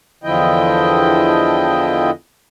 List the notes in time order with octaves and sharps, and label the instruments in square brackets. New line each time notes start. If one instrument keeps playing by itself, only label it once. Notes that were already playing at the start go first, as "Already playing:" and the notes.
[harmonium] E2 D3 F3 E4 D#5 G5